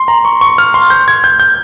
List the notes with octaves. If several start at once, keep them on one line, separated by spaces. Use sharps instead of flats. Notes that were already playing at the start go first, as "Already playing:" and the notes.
Already playing: C6
A#5
C#6
C#6
F6
C6
G6
G#6
G6
G6